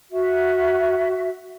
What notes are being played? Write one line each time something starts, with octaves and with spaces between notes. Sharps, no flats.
F#4 E5